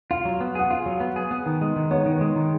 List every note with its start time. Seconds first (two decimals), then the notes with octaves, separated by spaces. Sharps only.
0.11 F4 F5
0.25 F#3
0.41 B3
0.55 G#4 F#5
0.70 F4 F5
0.86 F#3
1.00 B3
1.16 G#4
1.31 B3
1.46 D#3
1.61 G#3
1.76 D#3
1.91 B3 C#5
2.06 D#3
2.21 G#3
2.36 D#3